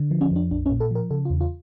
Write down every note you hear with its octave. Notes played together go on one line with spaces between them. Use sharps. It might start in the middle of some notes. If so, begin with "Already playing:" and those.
Already playing: D3
F3
C#4
F2 D4
A#1 D4
C#4
A#2
A4
F3 A#4
C#3 A4
F4
E2
F4